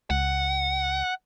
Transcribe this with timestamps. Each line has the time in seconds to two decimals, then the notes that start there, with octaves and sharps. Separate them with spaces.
0.10 C#2 F#5